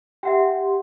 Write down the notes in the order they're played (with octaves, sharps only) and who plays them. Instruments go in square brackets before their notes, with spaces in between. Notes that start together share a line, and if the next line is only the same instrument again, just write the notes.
[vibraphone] G4 C6 [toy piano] E5 F#5 G5